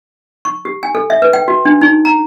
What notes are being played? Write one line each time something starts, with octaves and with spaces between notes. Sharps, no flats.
C#6
G4
G#5
A4
E5
B4
G5
F#4
D4
D#4
A#5